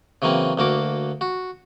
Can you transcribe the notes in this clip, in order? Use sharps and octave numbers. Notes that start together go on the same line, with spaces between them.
C#3 E3 F#3 A#3 C4
D2 A#3 F#4 D6
F#4